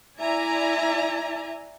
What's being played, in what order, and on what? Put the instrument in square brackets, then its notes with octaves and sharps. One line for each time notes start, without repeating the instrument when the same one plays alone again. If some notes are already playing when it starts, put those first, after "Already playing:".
[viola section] E4 D5 E5 G#5 A#5